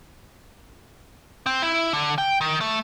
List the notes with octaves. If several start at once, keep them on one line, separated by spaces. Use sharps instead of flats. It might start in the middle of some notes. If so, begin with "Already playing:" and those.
C4
E4
D3
G5
D#3
A3